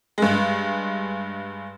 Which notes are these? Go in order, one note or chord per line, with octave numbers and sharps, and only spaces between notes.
G2 G#3